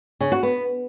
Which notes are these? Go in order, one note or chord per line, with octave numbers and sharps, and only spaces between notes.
C#3
F#4
B3